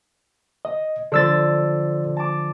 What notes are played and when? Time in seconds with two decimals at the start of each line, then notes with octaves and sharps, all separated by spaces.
0.65 D#5
1.12 D3 F3 A4 E6 A6
2.17 A5 D6